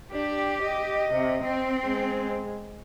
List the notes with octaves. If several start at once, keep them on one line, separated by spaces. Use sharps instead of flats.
D4 G4
D#5
C3
C4
G#3